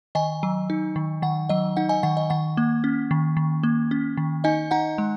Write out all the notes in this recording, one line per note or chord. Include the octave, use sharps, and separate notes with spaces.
D#3 D#5 G#5
F#3
D#4
D#3
D#3 F#5
F#3 D#5
D#4 F#5
D#5 G#5
D#3 F#5
D#5
D#3 F#5
A#3
C#4
D#3
D#3
A#3
C#4
D#3
D#4 D#5 G#5
D#4 F#5 A#5
G#3